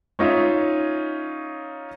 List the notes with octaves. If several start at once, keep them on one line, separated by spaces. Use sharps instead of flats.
C#4 D#4 F4 C#5 E5